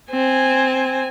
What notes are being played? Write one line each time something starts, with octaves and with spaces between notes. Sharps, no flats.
C4 G#5